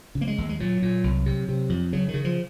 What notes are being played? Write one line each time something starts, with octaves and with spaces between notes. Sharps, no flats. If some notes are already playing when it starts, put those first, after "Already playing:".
C#3
A#3
G#3
D#2
G#3
A#2 F#3
A#2
C2
C3
C3
F2
C#3 F#3
D#3
C#3
F3